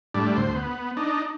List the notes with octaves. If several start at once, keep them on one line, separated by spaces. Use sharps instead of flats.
A2 G3 D4
D2 C5
B3
D4 D#4